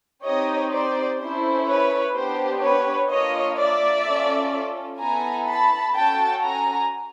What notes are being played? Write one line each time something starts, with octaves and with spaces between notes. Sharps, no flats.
C4 D#4 G4 C#5 D#5
C5 D5
C#4 E4 A4 C5
B4 C#5
B3 D4 G4 C5
B4 C#5
A#3 D4 F4 C#5 D#5
D5 E5
C#4 F4 A4
B3 E4 A4 G#5 A#5
A5 B5
C#4 F#4 A4 G5 A5
G#5 A#5